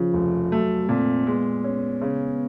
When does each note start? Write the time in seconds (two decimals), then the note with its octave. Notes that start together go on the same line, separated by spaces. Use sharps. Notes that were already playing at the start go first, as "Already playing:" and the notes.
Already playing: C#3 F3
0.14 F1
0.52 F#3 A3
0.89 A#2 C4
1.26 G#3 B3
1.64 C#4
2.02 C#3